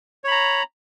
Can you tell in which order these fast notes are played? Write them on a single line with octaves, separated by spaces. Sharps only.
C#5 B5 A#5